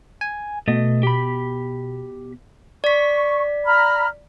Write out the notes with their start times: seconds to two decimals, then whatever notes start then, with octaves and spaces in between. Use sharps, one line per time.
0.21 G#5
0.68 B2 A3 D#5
1.03 G4 B5
2.84 D5 C#6 B6
3.65 A#5 B5 F6